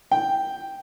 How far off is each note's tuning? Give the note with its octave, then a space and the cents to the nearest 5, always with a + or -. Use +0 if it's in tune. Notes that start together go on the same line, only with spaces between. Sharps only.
G5 +0